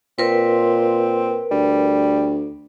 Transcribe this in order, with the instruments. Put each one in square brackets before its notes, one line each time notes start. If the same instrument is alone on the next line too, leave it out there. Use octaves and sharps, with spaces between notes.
[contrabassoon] A#2 [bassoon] C4 [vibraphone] A#4 B4
[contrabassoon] D2 [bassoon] G3